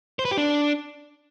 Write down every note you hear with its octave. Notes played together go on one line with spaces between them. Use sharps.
C5
B4
G4
D4